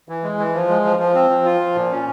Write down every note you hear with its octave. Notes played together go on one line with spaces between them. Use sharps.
E3
G#3
E3
F3
G#3
F3
F3
C4
F3
F4
F3
A#2
C#4